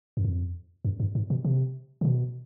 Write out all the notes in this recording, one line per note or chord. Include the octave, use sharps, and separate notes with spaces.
F#2
F2
F#2
G2
G#2
B2
C3
C3
B2